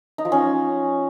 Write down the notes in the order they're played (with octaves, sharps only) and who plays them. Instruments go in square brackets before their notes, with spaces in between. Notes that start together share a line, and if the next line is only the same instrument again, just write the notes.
[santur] D#4
F3
C#4